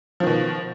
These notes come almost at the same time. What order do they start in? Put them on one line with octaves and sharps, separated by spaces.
F3 D#3 B2